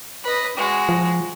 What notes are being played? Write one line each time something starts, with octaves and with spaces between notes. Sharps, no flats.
B4 D#5
G#3 F#4
F3